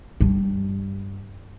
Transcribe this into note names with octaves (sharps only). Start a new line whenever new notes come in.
G2 G3